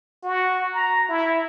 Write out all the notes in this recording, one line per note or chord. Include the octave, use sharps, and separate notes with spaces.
F#4
A#5
E4